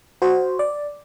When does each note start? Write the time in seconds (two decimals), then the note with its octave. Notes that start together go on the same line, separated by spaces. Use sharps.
0.22 F#4 C5
0.59 D5